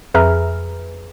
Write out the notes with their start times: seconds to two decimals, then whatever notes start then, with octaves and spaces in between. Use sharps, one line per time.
0.14 F2 G#4 B4 E5 A#5 F6